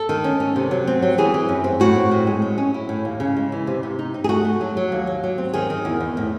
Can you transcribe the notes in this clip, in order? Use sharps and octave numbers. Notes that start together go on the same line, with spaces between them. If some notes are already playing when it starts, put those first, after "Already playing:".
Already playing: A4
D#3
C#4
C#4
C3
F#3
C4
F#3
E3 G#4
E3
F#2
C4
A2 F#4
C4
A2
G#3
F#3
C#4
E4
A2
D#2
C#3
G#3
E3
C3
C3
D#4
D#4
G#4
A3 F#4
A3
F#3
F#3
D#2
F#3
F#3
C4
D#3 G#4
D#3
E2
E2
A2